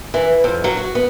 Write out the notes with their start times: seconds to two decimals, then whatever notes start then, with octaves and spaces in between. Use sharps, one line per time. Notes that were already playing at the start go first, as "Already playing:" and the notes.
0.14 E3
0.44 F2
0.64 F#3
0.77 F#4
0.95 B3